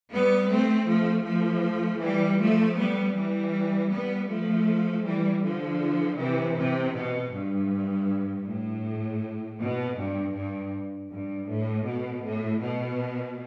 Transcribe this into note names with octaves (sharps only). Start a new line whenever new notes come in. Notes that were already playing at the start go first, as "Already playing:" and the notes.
G3 B3
A3 C4
F3 A3
F3 A3
E3 G3
F3 A3
G3 B3
E3 G3
G3 B3
F3 A3
E3 G3
D3 F3
C3 E3
C3
B2
G2
A2
B2
G2
G2
G2
A2
B2
A2
B2